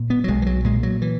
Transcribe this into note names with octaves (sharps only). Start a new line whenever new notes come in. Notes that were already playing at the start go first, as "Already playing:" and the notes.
Already playing: A#2
B3
F#3
B1 G#3
E3
F#3
A#2 G#3
F#3
E3